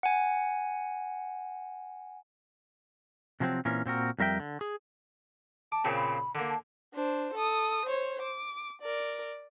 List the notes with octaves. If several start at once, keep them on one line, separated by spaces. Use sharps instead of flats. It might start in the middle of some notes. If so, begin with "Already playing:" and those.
F#5 G#5
C3 F3 F#3 A#3 C4
A#2 E3 C4 C#4 A#4
A#2 C4 F#4 A#4
F2 G3 A#4 E5 G5
D3
G#4
A5 D6
A#2 C#3 C4
B5
D3 A#3
A5
D4 C5
A4 D#6
C5 C#5
D6
A#4 D5